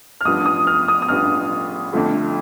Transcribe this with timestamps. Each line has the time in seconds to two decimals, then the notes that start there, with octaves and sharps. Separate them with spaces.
0.21 F6
0.25 A1 G2 F3 D#6
0.45 D#6
0.67 F6
0.88 D#6
1.02 D#6
1.08 A1 G2 F3 F6
1.93 F2 D3 F3 A3